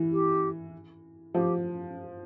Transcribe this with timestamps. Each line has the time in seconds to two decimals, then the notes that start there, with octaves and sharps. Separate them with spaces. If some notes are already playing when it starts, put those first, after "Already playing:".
Already playing: E3
0.12 G4
1.34 F3 G4